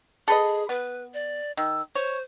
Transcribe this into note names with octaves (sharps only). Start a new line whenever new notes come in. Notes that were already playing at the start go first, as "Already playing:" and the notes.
G#4 A4 B4 D#5
B3 B4
D5
D#3 E6
C5 C#5